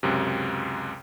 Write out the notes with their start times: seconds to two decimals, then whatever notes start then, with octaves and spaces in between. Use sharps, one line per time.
0.03 C#2 F#2 C3